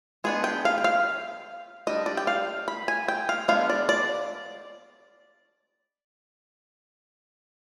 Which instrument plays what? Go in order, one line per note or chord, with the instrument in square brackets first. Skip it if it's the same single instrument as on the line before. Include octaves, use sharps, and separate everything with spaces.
[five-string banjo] G#3 B3 D4 G#4
G5
F5
G5
F5
G3 D4 D#5
D5
G5
F5
B5
G#5
G5
F5
G#3 B3 D4 F5
D5
D5